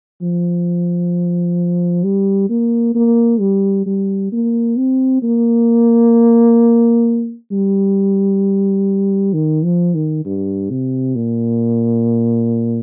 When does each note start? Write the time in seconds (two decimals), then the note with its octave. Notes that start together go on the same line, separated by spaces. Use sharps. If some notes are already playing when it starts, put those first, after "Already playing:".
0.22 F3
2.04 G3
2.49 A#3
2.95 A#3
3.40 G3
3.86 G3
4.32 A#3
4.77 C4
5.22 A#3
7.51 G3
9.33 D#3
9.64 F3
9.94 D#3
10.25 G2
10.70 C3
11.15 A#2